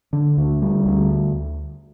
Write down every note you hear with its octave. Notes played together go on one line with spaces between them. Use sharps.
D3
D2
G3
D2